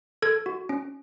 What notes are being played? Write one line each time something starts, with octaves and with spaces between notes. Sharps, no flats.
A4 G#6
F#4
C#4